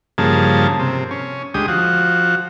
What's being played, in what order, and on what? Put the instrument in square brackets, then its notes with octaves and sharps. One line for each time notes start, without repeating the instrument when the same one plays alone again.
[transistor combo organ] G2 C#3 F3 A#3 G#4 A5
C3
C#4
D2 G#3 G4 D#6
F3 F#4